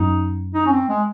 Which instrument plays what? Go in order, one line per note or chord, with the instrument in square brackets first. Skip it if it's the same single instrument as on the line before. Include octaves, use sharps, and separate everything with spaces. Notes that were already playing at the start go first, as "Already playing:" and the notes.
Already playing: [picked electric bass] F#2 [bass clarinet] D#4
[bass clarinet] D#4
C#4
C4
G#3